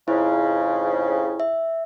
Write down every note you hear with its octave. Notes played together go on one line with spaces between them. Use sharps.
F2 G#2 C#3 E4
E5